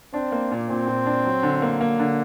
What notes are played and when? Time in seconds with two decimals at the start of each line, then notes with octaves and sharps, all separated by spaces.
0.13 C4 D4
0.32 A#3
0.52 A#2
0.70 A#2 C4
0.87 A#2
1.06 D4
1.25 F#3
1.43 D3
1.62 A#3
1.81 A#3
1.99 D3